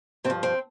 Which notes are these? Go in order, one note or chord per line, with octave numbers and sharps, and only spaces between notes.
G2 C4
F3
C4